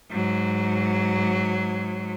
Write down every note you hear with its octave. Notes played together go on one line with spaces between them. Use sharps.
G#2 F#3